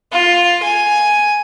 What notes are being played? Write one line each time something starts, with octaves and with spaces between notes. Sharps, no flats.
F4
G#5